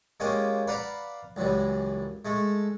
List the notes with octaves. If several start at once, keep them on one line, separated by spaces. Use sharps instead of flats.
G#3 A#3 C#4 F4 G4
B4 D5 F5 F#5 A#5 B5
C#2 F#2 E3 G3
G#3 A3 A4